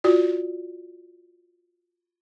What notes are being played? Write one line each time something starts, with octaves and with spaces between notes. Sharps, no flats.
F4 F#4 D5